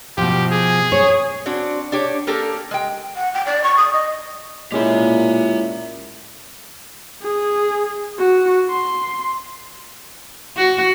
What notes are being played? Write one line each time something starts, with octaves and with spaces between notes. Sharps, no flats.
B2 F3 G4
G#4
C#5
C4 D4 F#4
D4 G4 C#5
A#3 G4 A4 A#4
G#3 G5
F#5
G5
D5
C#6
D#6
D#5
A#2 G#3 C#4 E4 G4 E5
G#4
F#4
C6
F#4